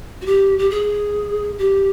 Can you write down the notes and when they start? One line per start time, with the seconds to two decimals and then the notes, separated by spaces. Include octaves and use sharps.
0.21 F#4
0.26 G4
0.59 G4
0.70 G#4
1.58 G4